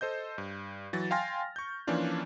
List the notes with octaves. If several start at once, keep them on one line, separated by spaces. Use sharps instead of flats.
A4 C5 D#5 G6
G2
E3 F#3 A6
F5 G5 G#5 C6 F6 A#6
C#6 G6
E3 F3 A#3 C#4 D4 F4